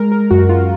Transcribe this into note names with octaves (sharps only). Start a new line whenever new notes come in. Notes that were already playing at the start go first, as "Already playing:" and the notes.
Already playing: G#3 A#4
A#4
F#2 F#4
F4